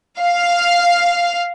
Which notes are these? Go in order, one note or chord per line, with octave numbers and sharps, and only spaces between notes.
F5